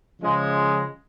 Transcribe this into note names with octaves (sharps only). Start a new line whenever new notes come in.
C#3 F3 G#3